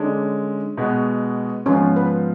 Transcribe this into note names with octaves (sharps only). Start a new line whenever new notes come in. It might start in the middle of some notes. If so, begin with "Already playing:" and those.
Already playing: D3 G#3 C#4 D4 D5
B2 G#3 B3 F#4
G#2 F3 B3 C#4 F4 C#5
B4